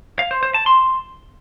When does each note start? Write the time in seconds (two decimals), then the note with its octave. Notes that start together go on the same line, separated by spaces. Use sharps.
0.19 F5
0.31 C5
0.43 C5
0.54 A5
0.66 C6